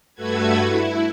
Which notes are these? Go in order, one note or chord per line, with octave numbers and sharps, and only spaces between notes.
G2 A3 F#4 A4 B4 G#6
E4